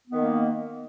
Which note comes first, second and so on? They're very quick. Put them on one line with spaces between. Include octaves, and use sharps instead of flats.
B3 D#3 A#3